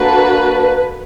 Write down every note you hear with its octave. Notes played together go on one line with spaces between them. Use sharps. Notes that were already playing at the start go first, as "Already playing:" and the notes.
Already playing: A#3 D4 F#4 A4 B4